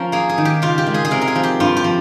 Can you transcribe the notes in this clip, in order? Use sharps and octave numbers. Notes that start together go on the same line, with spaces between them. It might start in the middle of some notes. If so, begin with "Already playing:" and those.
Already playing: F3 C#4 A#4
A#3 G#4
G#4
D#3
G4
C#3 F4
G4
G#3
G#4
G#4
C3 A#4
A#4
G#4
F3
G4
G2 F4
G4
F3